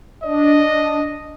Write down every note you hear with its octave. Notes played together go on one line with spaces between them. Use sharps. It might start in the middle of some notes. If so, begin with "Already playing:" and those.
D4 D#5